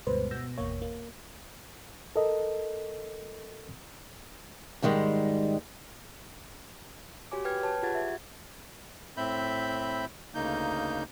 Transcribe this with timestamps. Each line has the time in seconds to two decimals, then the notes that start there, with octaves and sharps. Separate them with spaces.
0.07 D2 G2 B2 G#3 B4 C5
0.31 B2 B3 E6 G6 A#6
0.58 G#1 E2 B2 A#3 C#5
0.82 A#3
2.16 A4 A#4 D#5
4.82 G#2 D#3 G3 G#3
7.32 F#4 G4 C#5 G#5 D6
7.45 B4 G5 F6 G#6
7.63 B4 C#5 A5
7.83 F4 G4 G#4 F#5 G#6 A6
7.95 E5
9.17 A2 C4 E5 B5 G6
10.35 D2 C#3 A#3 D#4 G6